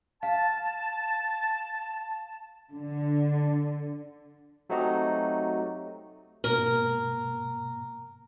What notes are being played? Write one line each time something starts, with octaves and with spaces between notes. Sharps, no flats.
F5 A5
D3
F#3 A3 C4 D#4 F#4 G4
G#2 B2 A#3 A#4